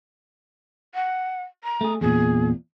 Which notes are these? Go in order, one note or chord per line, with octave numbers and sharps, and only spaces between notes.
F#5
A#5
A3 G#4
E2 A#2 G#4